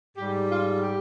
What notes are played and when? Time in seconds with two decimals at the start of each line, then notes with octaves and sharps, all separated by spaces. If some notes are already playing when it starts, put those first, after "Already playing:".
0.17 G#2 G3 G4
0.49 F4
0.80 G4